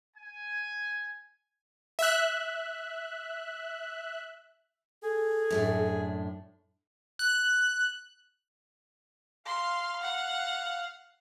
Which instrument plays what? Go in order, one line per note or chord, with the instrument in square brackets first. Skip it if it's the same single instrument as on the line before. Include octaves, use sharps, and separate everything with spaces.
[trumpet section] G#5
[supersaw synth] E5 F#6
[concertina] G#4 [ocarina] A4
[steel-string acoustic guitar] F#2 A2 D4
[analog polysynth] F#6
[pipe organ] F5 [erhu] C6
[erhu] F#5